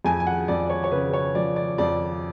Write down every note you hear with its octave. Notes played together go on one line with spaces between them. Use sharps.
F2 G#5
G#5
F#5
F2 D5
C#5
C#5
C#3 B4
B4
C#5
F3 D5
D5
F2 D5